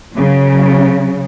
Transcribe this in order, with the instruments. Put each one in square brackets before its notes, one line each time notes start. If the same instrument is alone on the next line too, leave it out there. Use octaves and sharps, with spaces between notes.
[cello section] C#3 F#3